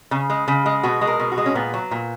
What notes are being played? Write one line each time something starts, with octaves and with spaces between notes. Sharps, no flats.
C#3
G#3
C#3
G#3
B2 F#4
G#3
A#4
B2
F#4
G#3
C#4
A#2 B3
F#3
A#2